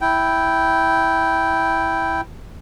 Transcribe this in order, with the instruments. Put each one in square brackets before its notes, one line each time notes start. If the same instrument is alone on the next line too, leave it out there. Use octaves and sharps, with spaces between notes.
[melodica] E4 G5